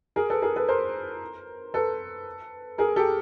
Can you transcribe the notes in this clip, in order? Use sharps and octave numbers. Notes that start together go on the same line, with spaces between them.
G#4 A#4
A4 B4
G#4 A#4
A4 B4
A#4 C5
A4 B4
G#4 A#4
G4 A4